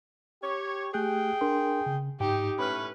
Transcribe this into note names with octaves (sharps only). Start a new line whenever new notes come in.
G4 C#5
A3 G4 G#4 G5 F#6
D4 A#4 C6
C#3
G#2 D#4 G4 G5
A2 C#4 B4 B5 F6